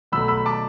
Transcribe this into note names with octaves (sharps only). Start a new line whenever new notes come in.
B2 F#3 A3 B5 E6
B5 E6
A5 D6